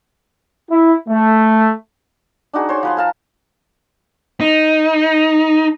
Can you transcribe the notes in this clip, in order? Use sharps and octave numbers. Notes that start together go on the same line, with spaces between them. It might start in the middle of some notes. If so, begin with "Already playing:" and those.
E4
A3
D4 D#4 F#4 G#4
C5 C#5 G#5 C6
F3 B4 C6
A#4 F5 A5
D#4